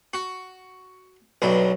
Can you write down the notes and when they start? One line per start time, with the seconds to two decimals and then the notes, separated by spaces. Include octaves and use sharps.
0.14 F#4
1.42 B1 G2 F#3